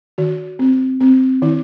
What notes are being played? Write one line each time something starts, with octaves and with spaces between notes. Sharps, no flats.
D#3 F#4
C4
C4
D#3 E4